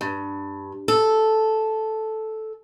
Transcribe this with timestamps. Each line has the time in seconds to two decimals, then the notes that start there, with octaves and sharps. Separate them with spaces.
0.01 G2
0.88 A4